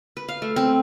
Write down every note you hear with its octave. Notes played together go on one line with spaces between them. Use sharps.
B4
F5
A3
C4